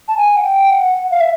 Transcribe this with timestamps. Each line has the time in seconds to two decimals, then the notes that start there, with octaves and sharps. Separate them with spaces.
0.08 A5
0.17 G#5
0.37 F#5
0.44 G5
0.71 F#5
1.11 F5
1.20 E5